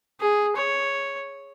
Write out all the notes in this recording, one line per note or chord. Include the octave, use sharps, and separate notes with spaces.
G#4
C#5